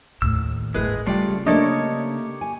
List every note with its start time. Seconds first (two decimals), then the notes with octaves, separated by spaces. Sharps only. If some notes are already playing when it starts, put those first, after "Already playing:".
0.22 D#2 A2 E6
0.74 G1 A2 G#3 G#4 B4
1.07 C#3 G3 A3 F4 D5 G5
1.46 A3 A#3 D4 G4 A4 C#5 D#5 A5
2.41 G#5